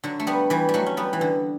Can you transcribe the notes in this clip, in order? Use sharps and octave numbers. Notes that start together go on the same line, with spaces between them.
D3 F#3
A3
G3 B3
E3 G3
G3
F#3 A3
C#4
G3 B3
E3
D3